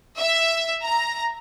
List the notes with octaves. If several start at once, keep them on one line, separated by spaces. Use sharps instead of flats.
E5
A#5